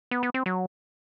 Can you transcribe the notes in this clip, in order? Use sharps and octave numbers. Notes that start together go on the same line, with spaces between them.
B3
B3
C4
F#3